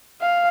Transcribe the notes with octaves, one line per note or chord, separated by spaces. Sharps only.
F5